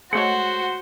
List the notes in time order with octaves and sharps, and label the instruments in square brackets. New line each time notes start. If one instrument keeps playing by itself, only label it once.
[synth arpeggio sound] G#3 A3 C#5 [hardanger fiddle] F#4 [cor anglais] C5 [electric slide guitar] F#5